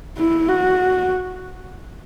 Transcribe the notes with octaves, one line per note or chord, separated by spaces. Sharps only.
E4
F#4